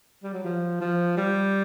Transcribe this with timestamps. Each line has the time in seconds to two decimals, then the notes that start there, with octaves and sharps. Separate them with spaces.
0.23 G3
0.33 F#3
0.44 F3
0.81 F3
1.17 G3